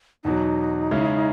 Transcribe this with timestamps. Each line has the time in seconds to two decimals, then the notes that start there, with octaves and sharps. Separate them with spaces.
0.24 E2 B2 F#3 D#4
0.91 C#3 G#3 C#4 E4